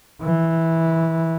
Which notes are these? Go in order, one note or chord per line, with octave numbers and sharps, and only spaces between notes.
E3